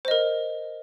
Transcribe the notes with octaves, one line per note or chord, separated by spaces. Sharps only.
A#4 C5 D#5